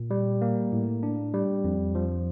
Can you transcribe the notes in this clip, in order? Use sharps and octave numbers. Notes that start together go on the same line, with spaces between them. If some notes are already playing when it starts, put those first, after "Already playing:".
Already playing: A#2
G3
A#3
A2
D4
G3
F2
F3